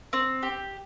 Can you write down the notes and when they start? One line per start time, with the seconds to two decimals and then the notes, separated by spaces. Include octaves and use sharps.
0.13 C4
0.43 G4